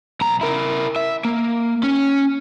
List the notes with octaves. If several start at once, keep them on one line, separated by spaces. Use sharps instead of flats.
B1 A#5
E4 A#4
E5
A#3
C#4